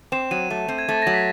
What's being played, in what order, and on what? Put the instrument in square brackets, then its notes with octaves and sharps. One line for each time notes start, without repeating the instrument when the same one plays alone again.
[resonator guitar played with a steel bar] C4 [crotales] E7
[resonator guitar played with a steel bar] F#3 [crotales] D#7
[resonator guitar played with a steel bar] A3
C4
[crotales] G#6
[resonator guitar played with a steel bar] A3 [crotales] A6
[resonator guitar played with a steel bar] F#3 [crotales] A#6
[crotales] B6